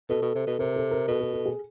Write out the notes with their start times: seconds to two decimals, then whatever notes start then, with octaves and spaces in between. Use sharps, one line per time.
0.10 B2 A4
0.21 B2
0.35 C3
0.47 B2
0.59 C3 A#4
0.76 A4
0.91 A#4
1.08 B2 A4
1.21 A4
1.33 A4
1.46 G#4